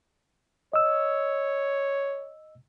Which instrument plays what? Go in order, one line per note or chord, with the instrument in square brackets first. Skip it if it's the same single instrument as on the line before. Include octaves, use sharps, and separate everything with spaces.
[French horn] C#5 [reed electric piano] D#5 E6